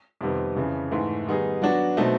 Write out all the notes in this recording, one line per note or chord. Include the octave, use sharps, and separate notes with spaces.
F2 C3 D#3 G3 B3
F2 C#3 E3
G#2 E3 A3
D#3 G3 B3 D#4 G#4
F#3 B3 D4 F#4
B2 F#3 A3 C4 D#4